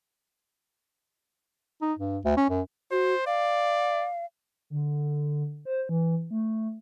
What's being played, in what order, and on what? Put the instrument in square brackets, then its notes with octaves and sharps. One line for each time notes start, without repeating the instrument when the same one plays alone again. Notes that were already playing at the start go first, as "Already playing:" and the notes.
[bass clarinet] D#4
G2
D2
C#4
F#2
[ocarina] F#4 [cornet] C5
[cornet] D5 [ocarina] F5
[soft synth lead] D3
C5
E3
A3